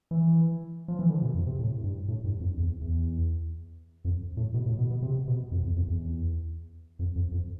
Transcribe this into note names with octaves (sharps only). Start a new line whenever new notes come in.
E3
F3
E3
D3
B2
F2
C3
A2
G2
A2
G2
F2
E2
E2
F2
A2
B2
A2
B2
B2
C3
B2
F2
E2
F2
E2
F2
F2
F2